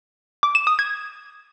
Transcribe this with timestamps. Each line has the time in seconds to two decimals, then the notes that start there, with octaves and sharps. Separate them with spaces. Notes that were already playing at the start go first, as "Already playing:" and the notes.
0.43 D6
0.55 E7
0.67 D#6
0.79 G#6